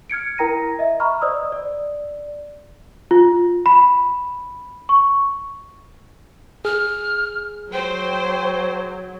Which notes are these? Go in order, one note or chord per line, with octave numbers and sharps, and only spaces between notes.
F6 G#6 C#7 D7
E4 A#4 G5 A#5 A#6 D#7
D#5 E5
A#5 B5 C#6 F6
C5 D5 D#5 D#6 E6
D5
F4
B5
C#6
G#4 F6
F#3 C5 G5